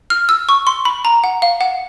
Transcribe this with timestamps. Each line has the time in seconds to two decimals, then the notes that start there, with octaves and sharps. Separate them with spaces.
0.10 F6
0.29 E6
0.49 C#6
0.67 C6
0.85 B5
1.05 A#5
1.24 F#5
1.42 F5
1.61 F#5